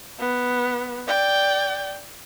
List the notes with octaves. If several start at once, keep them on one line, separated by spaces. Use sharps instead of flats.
B3
D5 G5